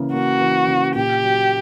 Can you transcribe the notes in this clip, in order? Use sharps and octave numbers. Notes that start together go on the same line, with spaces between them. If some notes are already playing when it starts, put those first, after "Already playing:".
Already playing: C#3 E3 A#3
A#3 F#4
E3
C#3
A#2 G4
F#3